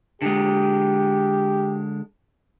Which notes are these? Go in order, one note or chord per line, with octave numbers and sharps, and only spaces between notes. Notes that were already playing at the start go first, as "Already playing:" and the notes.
D3 G#3 G4